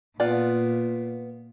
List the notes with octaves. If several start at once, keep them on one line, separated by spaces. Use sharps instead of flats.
A#2 B3 F4 D5